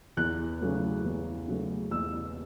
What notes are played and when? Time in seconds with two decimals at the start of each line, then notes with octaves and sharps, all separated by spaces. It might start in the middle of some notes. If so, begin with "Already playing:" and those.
0.17 E2 F#6
0.61 C#3 F#3 A3
1.05 E2
1.48 C#3 F#3 A3
1.91 E2 E6